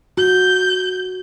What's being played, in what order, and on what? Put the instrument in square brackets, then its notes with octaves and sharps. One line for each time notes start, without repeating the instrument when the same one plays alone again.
[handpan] F#4 [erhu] G6